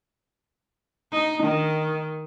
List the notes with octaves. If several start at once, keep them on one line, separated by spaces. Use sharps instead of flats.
D#4
D#3